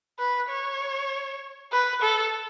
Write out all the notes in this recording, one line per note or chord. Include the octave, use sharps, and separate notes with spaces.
B4
C#5
B4
A4